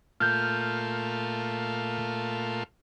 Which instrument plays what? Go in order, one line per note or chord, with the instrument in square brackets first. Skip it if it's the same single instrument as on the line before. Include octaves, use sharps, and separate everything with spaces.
[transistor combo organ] A#2 A3 F4 [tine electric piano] F6 G6